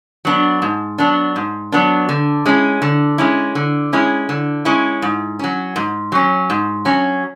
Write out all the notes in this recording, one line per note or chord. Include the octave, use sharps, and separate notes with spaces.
F#3 B3 D4
G#2
F#3 B3 D4
G#2
F#3 B3 D4
D3
G#3 C#4 E4
D3
G#3 C#4 E4
D3
G#3 C#4 E4
D3
G#3 C#4 E4
G#2
F#3 C#4
G#2
F#3 C#4
G#2
F#3 C#4